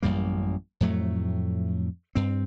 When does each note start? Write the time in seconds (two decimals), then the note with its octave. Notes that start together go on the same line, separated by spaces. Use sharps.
0.03 A1 F#2 G3 A#3
0.81 F2 A2 F#3 A3
2.15 G2 C4